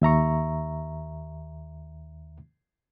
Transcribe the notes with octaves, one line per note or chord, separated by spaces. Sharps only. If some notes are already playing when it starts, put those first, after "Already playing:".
D#2 E5 A#5 C#6